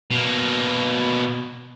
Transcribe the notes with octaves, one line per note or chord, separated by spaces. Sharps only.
B2 A#3